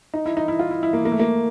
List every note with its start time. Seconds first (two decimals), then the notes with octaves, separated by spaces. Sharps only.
0.14 D#4
0.26 E4
0.37 D#4
0.48 E4
0.59 F4
0.71 E4
0.83 E4
0.93 A#3
1.05 A#3
1.12 A3
1.19 A#3